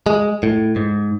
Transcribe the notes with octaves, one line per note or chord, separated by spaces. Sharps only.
G#3
A2
G#2